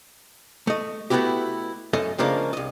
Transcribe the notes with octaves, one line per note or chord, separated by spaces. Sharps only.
A3 D#5
A3 B3 D#4 E4 F#4 G4
F#2 A3 A4 D#5 G#5
C#3 F3 G#3 A#3 D4
C2 D#5